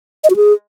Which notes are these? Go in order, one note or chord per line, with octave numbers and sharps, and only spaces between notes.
D#5
F#4
G#4